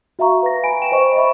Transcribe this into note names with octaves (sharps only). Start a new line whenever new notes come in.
F#4 E5 F5 A#5 C#6
B4 A#6
G#5 B5 D7
G5 E7
C5 D#5 C#6
D#5 E5 B5 C#6